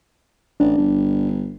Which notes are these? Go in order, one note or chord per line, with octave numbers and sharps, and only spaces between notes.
A1 D4
G1